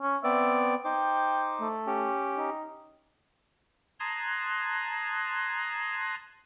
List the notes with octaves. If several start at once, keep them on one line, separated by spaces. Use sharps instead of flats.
C#4
B3 C4 D5 E5
D#4 C5 G5 D6
A3
C#4 G4
D#4
A5 A#5 C6 D#6 F#6 G#6